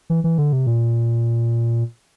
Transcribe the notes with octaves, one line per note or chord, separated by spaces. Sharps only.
E3
E3
D3
C3
A#2